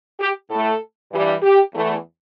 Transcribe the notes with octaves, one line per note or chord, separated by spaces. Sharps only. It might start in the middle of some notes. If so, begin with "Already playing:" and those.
G4
A2 A3 A4
G2 E3 G3
G4
E2 E3 A3